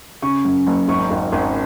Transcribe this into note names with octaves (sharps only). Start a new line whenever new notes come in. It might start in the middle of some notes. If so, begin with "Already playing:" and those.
C#3 C#6
F#2
F#1
G#1 C#6
G#1
G#1